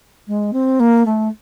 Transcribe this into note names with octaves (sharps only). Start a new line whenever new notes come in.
G#3
C4
A#3
A3